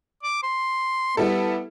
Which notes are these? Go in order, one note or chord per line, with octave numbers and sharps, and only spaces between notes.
D6
C6
G3 B3 E4 A4